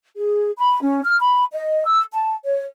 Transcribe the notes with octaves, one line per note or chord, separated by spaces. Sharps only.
G#4
B5
C#4
F6
B5
D#5
E6
A5
C#5